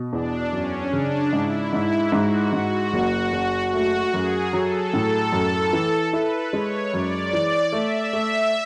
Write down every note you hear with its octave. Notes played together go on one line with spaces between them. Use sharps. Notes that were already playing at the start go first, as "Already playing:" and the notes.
Already playing: B2
E2 D4
F#2 C#4
C#3 D4
G#2 E4
G#2 E4
G#2 F#4
G#2 F#4
F#1
F#1
A3 F#4
F#2 G#4
F#3 A4
A2
F#2
E3
E4 B4
G#3 C#5
F#2 D5
E3
A3 E5
A3